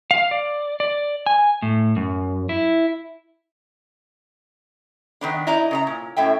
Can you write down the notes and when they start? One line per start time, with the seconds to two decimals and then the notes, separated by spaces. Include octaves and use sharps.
0.11 F5
0.31 D5
0.80 D5
1.26 G#5
1.62 A2
1.96 F#2
2.49 E4
5.21 D#3 B3 D4
5.47 D#4 E4 D5 D#5 A#5
5.71 C#3 D#5 A#5
5.87 A#2
6.17 F#2 A2 E5 G5